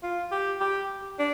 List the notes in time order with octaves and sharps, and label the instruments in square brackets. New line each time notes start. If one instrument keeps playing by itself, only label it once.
[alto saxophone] F4
G4
G4
D4